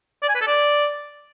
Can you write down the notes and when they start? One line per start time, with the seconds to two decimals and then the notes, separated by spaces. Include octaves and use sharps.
0.22 D5
0.29 G#5
0.35 B4
0.41 A4
0.47 D5